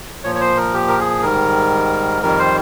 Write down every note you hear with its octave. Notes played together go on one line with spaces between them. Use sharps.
A#2 F3 C#5
C#5
C5
A#4
G4
A#4
G#4
G#2 D#3 G3 A#4
F2 D#3 G3 A#4
C5